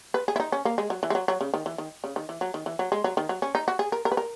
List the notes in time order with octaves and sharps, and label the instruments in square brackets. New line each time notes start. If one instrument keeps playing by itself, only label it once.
[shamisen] B4
G#4
E4
D#4
C#4
A#3
G#3
F#3
E3
G#3
F#3
F#3
C#3
D#3
E3
D#3
C#3
D#3
E3
F#3
D#3
E3
F#3
G#3
F#3
D#3
F#3
C#4
D#4
F#4
G#4
A#4
A#4
B4
A#4